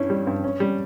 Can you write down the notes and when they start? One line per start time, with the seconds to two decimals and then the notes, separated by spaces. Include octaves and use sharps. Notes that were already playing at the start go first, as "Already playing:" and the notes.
Already playing: G2 C#4 E4
0.10 G3
0.27 G2
0.44 C#4
0.60 G3